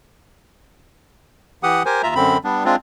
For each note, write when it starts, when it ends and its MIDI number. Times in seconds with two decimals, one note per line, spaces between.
1.63 1.83 52
1.63 1.83 67
1.63 1.83 78
1.63 1.83 87
1.86 2.02 67
1.86 2.02 70
1.86 2.02 72
1.86 2.02 80
2.03 2.14 39
2.03 2.14 65
2.03 2.14 76
2.03 2.14 82
2.15 2.37 42
2.15 2.37 50
2.15 2.37 60
2.15 2.37 83
2.44 2.65 55
2.44 2.65 59
2.44 2.65 62
2.65 2.76 56
2.65 2.76 60
2.65 2.76 62
2.65 2.76 65